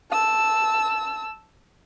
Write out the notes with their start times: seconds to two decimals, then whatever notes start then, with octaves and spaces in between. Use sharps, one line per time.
0.11 A5 E6